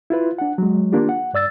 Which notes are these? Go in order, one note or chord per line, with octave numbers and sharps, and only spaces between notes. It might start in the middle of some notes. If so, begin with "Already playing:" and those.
E4 F4 B4
D4 F#5
F#3 G#3
D#3 A#3 D4 F4 G4
F#5
G2 D5 E6 A6